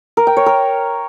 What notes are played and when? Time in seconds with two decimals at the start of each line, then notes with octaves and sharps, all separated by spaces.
0.17 A#4
0.27 G5
0.37 C#5
0.46 A#4